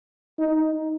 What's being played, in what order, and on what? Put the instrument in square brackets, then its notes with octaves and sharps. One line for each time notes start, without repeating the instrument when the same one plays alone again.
[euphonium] D#4